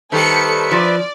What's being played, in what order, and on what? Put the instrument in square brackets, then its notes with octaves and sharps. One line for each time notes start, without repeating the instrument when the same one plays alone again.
[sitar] D#3 G3 G4 [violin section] A4 C#7 [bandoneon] B4 C5 E5
[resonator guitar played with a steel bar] F3 [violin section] D5